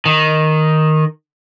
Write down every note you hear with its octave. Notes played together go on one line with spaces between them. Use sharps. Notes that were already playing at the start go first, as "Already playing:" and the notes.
D#3